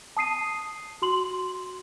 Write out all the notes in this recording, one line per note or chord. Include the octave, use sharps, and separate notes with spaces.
A5 D#6 C7 D#7
F#4 C6 F#7